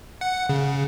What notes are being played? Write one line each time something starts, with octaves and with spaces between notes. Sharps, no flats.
F#5
C#3